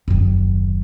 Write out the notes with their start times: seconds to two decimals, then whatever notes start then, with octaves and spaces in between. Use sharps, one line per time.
0.08 F#1 D#2